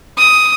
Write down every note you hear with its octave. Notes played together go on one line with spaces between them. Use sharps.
D#6